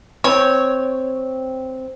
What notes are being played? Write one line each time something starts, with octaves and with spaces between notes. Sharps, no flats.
C4 C#5